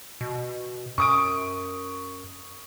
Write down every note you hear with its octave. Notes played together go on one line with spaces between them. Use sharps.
B2
F#2 C#6 D#6 D7